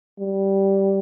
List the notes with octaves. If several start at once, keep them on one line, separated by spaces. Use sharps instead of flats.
G3